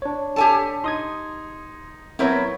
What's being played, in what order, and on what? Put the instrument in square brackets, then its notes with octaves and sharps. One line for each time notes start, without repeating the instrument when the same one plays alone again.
[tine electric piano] D4 C#5
[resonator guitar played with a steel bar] G4 G#5 A5 [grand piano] A4
[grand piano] D#4 [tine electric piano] C6 D#6 G#6
[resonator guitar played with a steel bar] F#3 C4 E4 [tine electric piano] B3 A#4 C#5